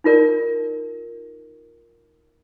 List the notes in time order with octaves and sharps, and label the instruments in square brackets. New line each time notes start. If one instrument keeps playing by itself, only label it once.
[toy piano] D#4 F4 A#4 D5